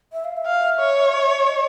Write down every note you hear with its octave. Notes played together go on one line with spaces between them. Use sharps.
E5
F5
E5
F5
C#5
D#5